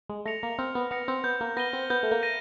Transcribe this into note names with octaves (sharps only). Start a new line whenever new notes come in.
G#3
A3 A#6 C#7 F7
A#3
C4 F6
B3
B3 A#6 C#7 F7
C4
B3 G6
A#3
B3 A#6 D#7 G7
C4
B3 G6
A3
A#3
A#6 D#7 G7